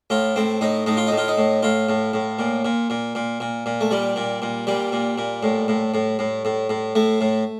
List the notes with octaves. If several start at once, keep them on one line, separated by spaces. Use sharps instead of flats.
A2 F4
A2 C4
A2 D#4
A2 D#4
F4
D#4
A2
F4
D#4
A2
A2 F4
A2
A2
A#2
A#2
A#2
A#2
A#2
A#2
A3
A#2 G3
A#2
A#2
A#2 G3
A#2
A#2
A2
A2
A2
A2
A2
A2
A2 A3
A2